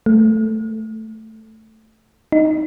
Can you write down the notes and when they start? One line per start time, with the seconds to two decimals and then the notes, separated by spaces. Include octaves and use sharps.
0.06 A3
2.32 D#4